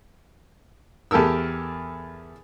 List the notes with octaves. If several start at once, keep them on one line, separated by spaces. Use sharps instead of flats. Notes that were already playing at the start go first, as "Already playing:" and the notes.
E2 G4 A4 A#4 E6